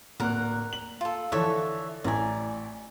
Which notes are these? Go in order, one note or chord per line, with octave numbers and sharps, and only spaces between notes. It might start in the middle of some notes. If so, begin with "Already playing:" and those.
D1 A#2 A#4 F#5 F#6
F#7
F4 A4
D3 E3 F3 A4 C#5 E5
A1 E4 D5 G#5 A#5